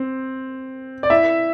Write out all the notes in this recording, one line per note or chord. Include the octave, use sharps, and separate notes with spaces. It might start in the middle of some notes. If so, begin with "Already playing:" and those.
Already playing: C4
D5
E4 E5